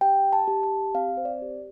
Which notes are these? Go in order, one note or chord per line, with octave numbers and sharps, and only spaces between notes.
G4 G5
A5
G4
A5
C4 F5
C5
D5
G4